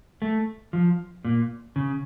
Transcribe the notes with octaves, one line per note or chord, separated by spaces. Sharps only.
A3
F3
A#2
C#3